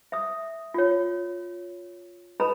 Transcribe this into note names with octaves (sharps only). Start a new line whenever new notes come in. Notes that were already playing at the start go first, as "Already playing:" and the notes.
E5 D#6
F4 C#5
A4 B4 D#5 A#5 B5